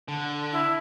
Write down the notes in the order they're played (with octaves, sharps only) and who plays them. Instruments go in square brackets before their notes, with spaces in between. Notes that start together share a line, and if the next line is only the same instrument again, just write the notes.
[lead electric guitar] D3
[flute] E4